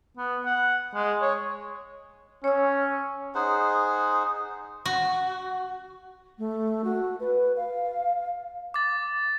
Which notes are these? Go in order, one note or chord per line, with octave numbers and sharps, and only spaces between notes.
B3
F#5
G#3
C#5
C#4 C#5 E6
D#4 G#4 C5 F#5
F#4
A3
F#4
B4
F5
D6 A6